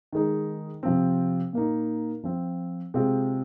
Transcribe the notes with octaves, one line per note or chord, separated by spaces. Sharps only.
D#3 G#3 D#4
C3 F3 C4
A#2 A#3 D#4
F3 C4 F4
C3 G#3 C4 F4